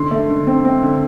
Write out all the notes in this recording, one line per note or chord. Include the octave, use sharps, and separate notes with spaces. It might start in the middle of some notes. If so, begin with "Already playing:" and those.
Already playing: D3 C6
A3
D3
C4
C4
D3